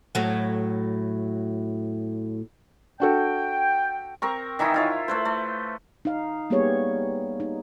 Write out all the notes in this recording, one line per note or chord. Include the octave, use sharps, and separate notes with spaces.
A2 F#3
D4 F#4 A4 G5
C4 A#4 C#6
D#3 E3 D#4 E4
E4 F4 C#5
A3 B4 C5
A3
D#4 F5
G3 A#3 B3 G4 G#4 C#5
D#4